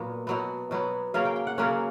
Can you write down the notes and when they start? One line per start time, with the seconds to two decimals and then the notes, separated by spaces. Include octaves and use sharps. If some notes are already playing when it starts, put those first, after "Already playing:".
Already playing: A#2 F#3 B3
0.27 B2 F#3 B3
0.71 B2 F#3 B3
1.14 C#3 F#3 A#3 C#4 F5
1.25 G5
1.36 G5
1.47 F#5
1.58 C#3 F#3 A#3 C#4 F#5